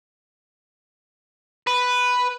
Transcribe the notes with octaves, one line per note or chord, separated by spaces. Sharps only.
B4